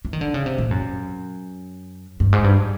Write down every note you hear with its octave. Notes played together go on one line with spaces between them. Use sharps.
E3
D#3
D3
C#3
C3
A#2
F#2
G2
G#2
G2